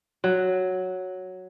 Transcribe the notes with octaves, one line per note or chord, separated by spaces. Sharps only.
F#3